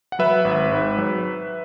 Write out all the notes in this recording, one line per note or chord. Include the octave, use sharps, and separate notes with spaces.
F#5
F#3 B4 E5
G#1
G#2
F#3